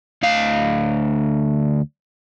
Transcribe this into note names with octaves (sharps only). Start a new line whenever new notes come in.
D2 F5